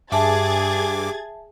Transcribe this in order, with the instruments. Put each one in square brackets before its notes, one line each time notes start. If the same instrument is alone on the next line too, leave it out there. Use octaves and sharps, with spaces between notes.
[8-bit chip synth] G2 D6 [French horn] G4 [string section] G#4 G#6 A6 [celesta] E5 A5